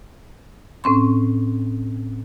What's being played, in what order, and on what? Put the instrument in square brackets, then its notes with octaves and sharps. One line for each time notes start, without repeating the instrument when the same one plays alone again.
[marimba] A2 C4 C#4 C6